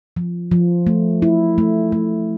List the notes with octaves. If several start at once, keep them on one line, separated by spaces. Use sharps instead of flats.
F3
F3
A3
E4
A3
A3